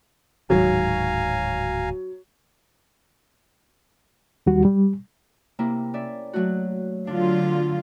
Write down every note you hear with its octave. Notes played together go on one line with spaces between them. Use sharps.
D1 G#2 D#3 F#3 F5 G#5 A#5
D#2 G3 F#4
G3
C3 A#3 E4
C#4 D5 E5
F#3 A3 F#4
D3 F#3 D4 F4